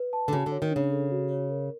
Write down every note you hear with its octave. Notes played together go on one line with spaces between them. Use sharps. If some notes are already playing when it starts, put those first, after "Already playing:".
Already playing: B4
A5
D3
C#3 F#4
D3
C#5
D#3
C#3 D4
A4
F#4
C#5
A#4